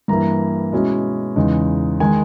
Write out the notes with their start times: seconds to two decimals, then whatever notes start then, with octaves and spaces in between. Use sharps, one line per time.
0.08 G2 E3 A#3 E4 A#5
0.73 B2 G#3 C#4 E4
1.36 E2 C#3 G#3 D#4
2.00 D#3 G#3 G#5